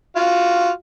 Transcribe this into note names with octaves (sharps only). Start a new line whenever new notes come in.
F4 F#4 F5